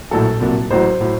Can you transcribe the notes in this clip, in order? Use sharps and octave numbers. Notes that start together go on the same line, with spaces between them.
A#1 A2 F#3 A4
C2 A#2 F#3
A1 A2 F#3 C5
A2 F#3